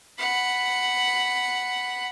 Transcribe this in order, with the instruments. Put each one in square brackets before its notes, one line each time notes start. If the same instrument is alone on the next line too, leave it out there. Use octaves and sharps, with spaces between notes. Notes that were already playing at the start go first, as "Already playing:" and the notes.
[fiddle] F#5 B5